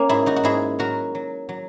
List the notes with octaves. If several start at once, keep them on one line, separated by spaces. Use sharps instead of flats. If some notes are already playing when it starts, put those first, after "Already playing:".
Already playing: A#3 C#4
G#2 E4 G#4
D#4 F#4
F#4
G#2 E4 G#4
F#3 F#4 A#4
F#3
F#3